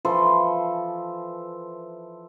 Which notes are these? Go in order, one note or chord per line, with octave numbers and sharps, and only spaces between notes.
E3 F3 A4 C6